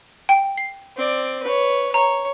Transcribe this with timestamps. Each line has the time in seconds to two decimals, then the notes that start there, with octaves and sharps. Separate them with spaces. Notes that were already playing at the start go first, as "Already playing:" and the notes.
0.29 G5
0.58 C7
0.97 C4 D5
1.43 B4 C#5
1.94 C#5 A#5